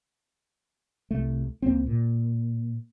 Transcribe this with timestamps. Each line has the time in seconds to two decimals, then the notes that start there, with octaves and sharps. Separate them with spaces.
1.11 C2 A3
1.62 C#2 A#3 C4
1.87 A#2